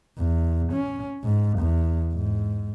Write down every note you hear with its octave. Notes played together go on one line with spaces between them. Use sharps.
E2
C#4
G#2
E2
G#2